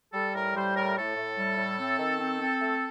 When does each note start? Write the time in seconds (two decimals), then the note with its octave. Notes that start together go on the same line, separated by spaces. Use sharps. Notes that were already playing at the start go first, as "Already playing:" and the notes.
0.13 G3 A4
0.34 A2 A#4
0.55 G3 C5
0.75 A2 A#4
0.96 A2 A4
1.17 A2
1.37 G3
1.57 A2
1.79 C4
1.99 D#3
2.20 C4
2.40 C4
2.61 A3